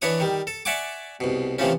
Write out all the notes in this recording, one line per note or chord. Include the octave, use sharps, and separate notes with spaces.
E3 D4 B4 C#5 C#6 D#6
D#3 G3
A4
D5 E5 F#5 G#5 C#6 D6
C2 B2
C3 E3 F3 A3 C#4